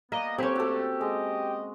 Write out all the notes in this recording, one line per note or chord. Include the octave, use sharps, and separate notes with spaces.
G3 A#3 B3 D#5
C4 C#4 G4 A4 B4 G#5
G2 A3 F#4 A4
G#3 D#5